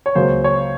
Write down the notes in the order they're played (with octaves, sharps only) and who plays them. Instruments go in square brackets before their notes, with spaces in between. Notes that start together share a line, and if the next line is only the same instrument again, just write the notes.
[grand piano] C#5
C#2 C#3 F#3 A#3 C#4 C5
C#5